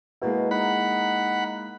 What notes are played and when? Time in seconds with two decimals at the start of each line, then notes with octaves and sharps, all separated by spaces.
0.22 B2 G#3 A#3 E4
0.51 D#4 F#5 B5